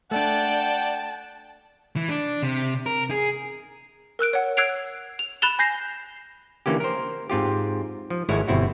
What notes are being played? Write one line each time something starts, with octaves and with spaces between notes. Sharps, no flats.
A3 D4 D5 F#5 G5 A5
E3
D4
C3
A#4
G#4
A#4 E6 F#6 D7
C#5 F#5
E6 F#6 G#6 C7 D7 F7
F7
B5 F#6 A6 E7 F7 G7
G#5 G6 A#6 C7
D3 E3 A#3 C#4 G4
A#4 C5
G#2 C4 F4 G4
F3
G#1 G#3 A3 E4 C#5
G1 B2 C4 E4 F#4